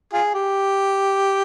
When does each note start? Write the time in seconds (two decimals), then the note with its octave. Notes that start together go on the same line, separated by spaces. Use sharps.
0.13 F4 G#4
0.34 G4